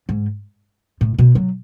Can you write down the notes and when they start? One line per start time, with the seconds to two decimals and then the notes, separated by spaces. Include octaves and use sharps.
0.09 G#2
1.01 A2
1.19 B2
1.35 F#3